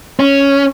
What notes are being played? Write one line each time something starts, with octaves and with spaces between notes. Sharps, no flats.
C#4